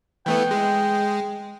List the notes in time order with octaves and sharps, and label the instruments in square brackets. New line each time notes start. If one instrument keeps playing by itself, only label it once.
[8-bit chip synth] E3 A3 B3 [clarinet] G5
[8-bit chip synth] G#3